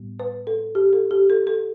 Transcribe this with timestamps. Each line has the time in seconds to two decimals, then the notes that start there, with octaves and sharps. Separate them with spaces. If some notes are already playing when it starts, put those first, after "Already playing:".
Already playing: A2 G3 B3
0.20 B4
0.47 A4
0.75 G4
0.93 A4
1.11 G4
1.30 A4
1.47 A4